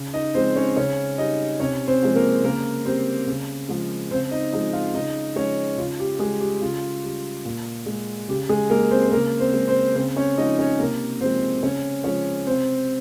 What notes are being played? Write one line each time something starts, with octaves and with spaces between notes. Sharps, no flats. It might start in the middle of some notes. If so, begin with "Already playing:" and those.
Already playing: C#3
D#4 D#5
F3 G#3 C4 C5
C#4 C#5
C#3 C#4 C#5
G3 D#4 D#5
C3 C#4 C#5
C4 C5
F3 G#3
A#3 A#4
C#3 A#3 A#4
G3 C4 C5
C#3
F3 G#3
C#3 C4 C5
D#4 D#5
F3 G#3 D#4 D#5
F4 F5
C#3 D#4 D#5
F3 G#3 C#4 C#5
C#3 F4
G4
G3 G#3 G#4
G4
C#3 F4
G3
A#2
G#3
C#3 G4
G#3 G#4
G#3 A#3 A#4
C4 C5
C5
C#3 A#3 A#4
C4 C5
G#3
C4 C5
C#3 C4 C5
C#4 C#5
F3 G#3 D#4 D#5
C#4 C#5
C3 A#3 A#4
F3 G#3 C4 C5
C#3 C#4 C#5
F3 G#3 C#4 C#5
C3 C4 C5